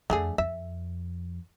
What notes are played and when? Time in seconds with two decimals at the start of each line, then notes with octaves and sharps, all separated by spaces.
0.10 F2 D3 A3 G#4
0.38 F2 E5